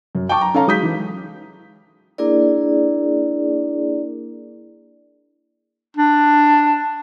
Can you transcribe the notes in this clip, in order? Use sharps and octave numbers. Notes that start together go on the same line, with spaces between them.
F#2
G5 A5 C#6 D6
A#5
C#4 A4 F5 A#5
F#3 G#3 D#6 G6 B6
E3
A#3 D4 E4 G#4 A#4 D5
D4